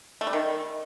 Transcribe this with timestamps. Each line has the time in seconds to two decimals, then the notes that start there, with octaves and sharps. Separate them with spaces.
0.21 A3
0.27 G3
0.33 D#3